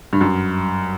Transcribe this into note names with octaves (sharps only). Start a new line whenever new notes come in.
G2
F#2